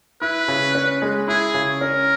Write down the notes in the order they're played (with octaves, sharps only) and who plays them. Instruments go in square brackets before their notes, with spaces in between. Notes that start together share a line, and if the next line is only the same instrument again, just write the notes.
[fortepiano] E4 [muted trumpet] B4
[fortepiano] C#3
C#4
G#3
[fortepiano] E4 [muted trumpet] G#4
[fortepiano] C#3
[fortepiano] C#4 [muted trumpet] A#4